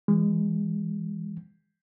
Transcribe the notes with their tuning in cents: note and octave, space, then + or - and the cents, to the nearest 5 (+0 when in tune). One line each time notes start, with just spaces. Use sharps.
E3 +0 G#3 -25